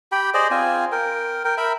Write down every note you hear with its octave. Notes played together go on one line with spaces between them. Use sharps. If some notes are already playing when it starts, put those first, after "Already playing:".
G4 G5 B5
G#4 C5 D5 D#5
C4 F4 G#5
A#4 G5
A#4 G5
A#4 E5 B5